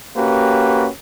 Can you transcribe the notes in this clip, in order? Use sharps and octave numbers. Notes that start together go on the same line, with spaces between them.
A#3 C#4 F#4 G4 B4